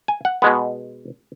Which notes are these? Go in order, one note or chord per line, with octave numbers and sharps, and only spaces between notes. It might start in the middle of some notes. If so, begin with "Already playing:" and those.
G#5
F#5
B2 G#3 B3